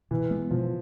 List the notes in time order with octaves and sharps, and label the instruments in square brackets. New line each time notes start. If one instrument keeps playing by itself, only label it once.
[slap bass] B2 [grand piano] E3
[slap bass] G#3 B3
[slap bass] B2 [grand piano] F3